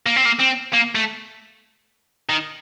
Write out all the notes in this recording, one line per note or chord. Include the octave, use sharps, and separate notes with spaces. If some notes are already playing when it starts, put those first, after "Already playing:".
A#3
C4
A#3
C4
A#3
A3
D#3